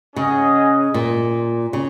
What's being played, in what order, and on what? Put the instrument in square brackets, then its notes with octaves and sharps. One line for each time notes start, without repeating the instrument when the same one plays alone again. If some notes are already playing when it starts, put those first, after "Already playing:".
[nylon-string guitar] C#3 [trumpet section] C#4 G#4 D#5 F#5
[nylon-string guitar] A#2
C#3